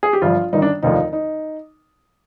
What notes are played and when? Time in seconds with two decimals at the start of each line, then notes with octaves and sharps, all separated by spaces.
0.03 G#4
0.13 G4
0.22 G1 G2 F3 F4
0.53 G1 G2 D#3 D#4
0.62 D4
0.83 F1 D#2 D3 F3 D#4
1.13 D#4